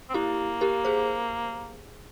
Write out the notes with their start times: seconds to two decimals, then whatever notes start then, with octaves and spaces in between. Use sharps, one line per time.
0.10 C4
0.14 A#3 E4 G4
0.61 G4 A#4
0.85 G#4 C5